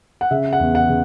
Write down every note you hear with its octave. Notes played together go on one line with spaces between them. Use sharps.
F#5
C#3 E5
F#5
E2
F#5
C#3